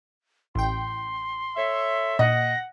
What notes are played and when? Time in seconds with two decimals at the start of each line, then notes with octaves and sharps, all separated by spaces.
0.55 A1 G5 C6
1.56 A4 C#5 E5
2.19 A#2 D#5 F#5 A#6